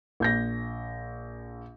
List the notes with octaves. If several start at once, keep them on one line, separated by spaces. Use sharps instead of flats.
A#1 G6 A#6